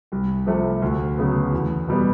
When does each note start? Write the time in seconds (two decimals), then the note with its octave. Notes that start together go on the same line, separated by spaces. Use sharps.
0.12 C2
0.46 C3 F3 A3
0.82 D2
1.17 C#3 F#3 B3
1.52 E2
1.88 B2 G3 B3